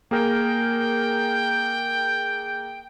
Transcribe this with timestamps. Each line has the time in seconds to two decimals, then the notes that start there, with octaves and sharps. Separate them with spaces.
0.11 A#3 G#4 A#4 G5